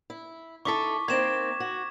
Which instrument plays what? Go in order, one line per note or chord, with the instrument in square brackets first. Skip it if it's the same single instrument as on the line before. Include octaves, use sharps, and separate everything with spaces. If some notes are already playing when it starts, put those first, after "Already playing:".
[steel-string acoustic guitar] E4
[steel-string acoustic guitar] D#4 E4 A4 [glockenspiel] C#6 D6 B6
[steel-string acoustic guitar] A#3 C4 D#4 [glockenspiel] G#6 E7
[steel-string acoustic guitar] F#4